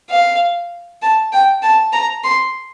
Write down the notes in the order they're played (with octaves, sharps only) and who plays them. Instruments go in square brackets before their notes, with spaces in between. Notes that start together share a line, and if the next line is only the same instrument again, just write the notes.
[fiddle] F5
A5
G5
A5
A#5
C6